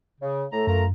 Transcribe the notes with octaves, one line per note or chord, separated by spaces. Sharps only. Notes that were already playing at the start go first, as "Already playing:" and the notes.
C#3
A2 A3 A#5
F#2 F4 A#4 A#5